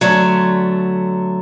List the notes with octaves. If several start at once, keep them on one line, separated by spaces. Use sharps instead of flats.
D3 F#3 A3